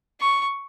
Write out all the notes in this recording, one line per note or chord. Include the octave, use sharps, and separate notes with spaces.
C#6